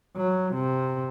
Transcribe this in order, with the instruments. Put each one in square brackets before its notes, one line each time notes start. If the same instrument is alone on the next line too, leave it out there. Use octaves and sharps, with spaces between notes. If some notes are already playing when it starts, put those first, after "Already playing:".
[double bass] F#3
C3